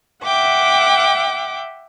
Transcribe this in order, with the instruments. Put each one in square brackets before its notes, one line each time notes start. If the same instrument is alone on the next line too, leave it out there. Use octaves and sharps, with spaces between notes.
[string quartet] E5 F#5 G5 D6